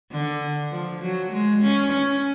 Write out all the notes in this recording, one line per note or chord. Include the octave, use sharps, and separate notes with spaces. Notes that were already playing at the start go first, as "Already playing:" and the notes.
D3
F3
F#3
G#3
C#4
C#4